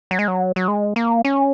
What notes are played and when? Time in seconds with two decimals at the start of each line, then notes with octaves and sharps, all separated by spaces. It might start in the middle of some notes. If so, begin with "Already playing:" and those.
0.11 F#3
0.19 G#3
0.28 F#3
0.56 F#3
0.68 G#3
0.96 A#3
1.25 C#4